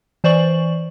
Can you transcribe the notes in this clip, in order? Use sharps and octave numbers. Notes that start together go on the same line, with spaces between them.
E3 C5 D5 C#6 F#7